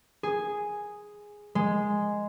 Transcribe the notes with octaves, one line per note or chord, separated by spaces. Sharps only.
G#4
G#3